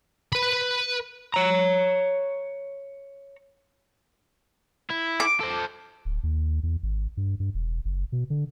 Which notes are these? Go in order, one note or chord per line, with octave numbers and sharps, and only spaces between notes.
B4 B5
C#5 A#5
E4
D6
A4 C5
D1
D#2
E2
G#1
G2
G2
E1
F#1
B2
D3